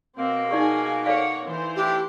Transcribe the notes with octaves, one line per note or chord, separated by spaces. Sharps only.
B2 A#3 C4
D#4 G#4 D5 G#5 C#6
A4 C#5 D5 F5 F#5
E3 C5
A3 D4 E4 G4